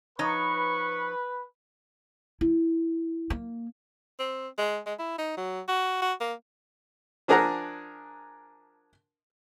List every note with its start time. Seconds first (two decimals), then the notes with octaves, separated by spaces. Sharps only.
0.19 F3 D#4 B4 C#5 C#6
2.41 E4
3.30 A#3
4.19 C4
4.58 G#3
4.86 G#3
4.99 E4
5.18 D#4
5.37 F#3
5.68 F#4
6.02 F#4
6.21 A#3
7.28 F3 D4 G#4 A#4 F#5 A#5